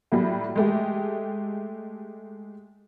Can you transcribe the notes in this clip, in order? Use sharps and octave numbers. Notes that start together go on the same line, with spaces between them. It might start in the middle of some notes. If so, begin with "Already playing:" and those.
A2 F#3 G3
G#3 A3 G4